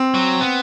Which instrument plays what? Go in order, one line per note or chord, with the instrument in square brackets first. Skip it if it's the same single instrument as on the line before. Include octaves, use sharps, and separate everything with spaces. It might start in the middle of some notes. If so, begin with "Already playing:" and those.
Already playing: [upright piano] C4
[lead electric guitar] F#3
B3